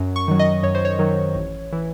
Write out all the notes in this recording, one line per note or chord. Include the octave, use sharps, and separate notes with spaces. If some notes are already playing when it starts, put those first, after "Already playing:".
Already playing: F#2
C#6
D#3 F#3
D#5
F#2 C#5
C5
C#5
D#3 F#3
A1
E3